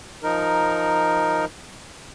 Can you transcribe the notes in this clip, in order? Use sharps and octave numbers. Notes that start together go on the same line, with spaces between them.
F3 D#4 A#4